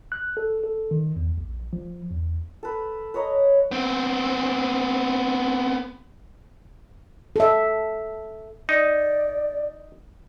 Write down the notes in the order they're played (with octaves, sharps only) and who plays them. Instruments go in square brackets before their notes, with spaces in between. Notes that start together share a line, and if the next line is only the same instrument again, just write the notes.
[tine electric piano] F#6
A4
A4
D#3
E2
A#1
F3
E2
[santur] A4 B4
B4 C#5 D#5 A#5
[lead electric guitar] B3 C4
[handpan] A4 E5
[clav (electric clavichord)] D#4 [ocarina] D5